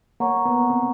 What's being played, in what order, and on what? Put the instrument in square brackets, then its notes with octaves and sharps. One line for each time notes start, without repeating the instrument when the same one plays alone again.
[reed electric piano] A#3 [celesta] A#4 C#5 F#5 A#5 C#6
[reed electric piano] B3
C4